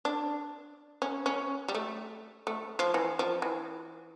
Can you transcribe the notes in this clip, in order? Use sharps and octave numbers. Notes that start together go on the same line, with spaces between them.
D4
C#4
C#4
G3
A3
A3
F3
E3
F3
E3